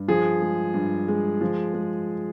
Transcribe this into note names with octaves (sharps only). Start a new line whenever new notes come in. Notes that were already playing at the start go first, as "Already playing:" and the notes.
Already playing: G2
F3 G#4
G#3
G2
G#3
F3
G#3